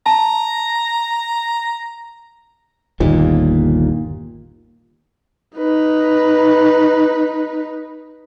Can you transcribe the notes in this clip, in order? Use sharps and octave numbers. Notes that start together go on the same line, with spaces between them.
A5 A#5
G1 D#2 A#2
D#4 B4